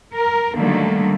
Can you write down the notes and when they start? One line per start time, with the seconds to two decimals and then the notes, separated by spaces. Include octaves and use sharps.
0.14 A#4
0.56 D3 D#3 F#3 G3 A3 A#3